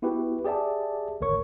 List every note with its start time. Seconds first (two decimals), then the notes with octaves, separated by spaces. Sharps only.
0.02 B3 E4 F#4 G4 B4
0.44 G4 G#4 D5 E5 A5
1.21 G#1 D2 A#4 C#5 C#6